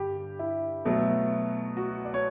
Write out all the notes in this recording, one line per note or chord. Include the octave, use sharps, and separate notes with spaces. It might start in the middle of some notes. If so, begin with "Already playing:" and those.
Already playing: G2 D3 G4
E4
B2 F#3 A3
F#4
D5
C#5